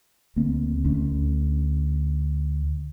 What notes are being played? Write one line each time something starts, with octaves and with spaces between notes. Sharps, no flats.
D2 A#3 C4
D2 C#4